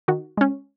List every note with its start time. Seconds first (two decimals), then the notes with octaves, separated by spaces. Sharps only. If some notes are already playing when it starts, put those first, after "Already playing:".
0.08 D#3 F#4
0.37 G#3 C#4